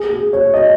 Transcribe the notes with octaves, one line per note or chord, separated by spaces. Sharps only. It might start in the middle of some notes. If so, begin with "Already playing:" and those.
Already playing: G#4
G#4
C#5
D#5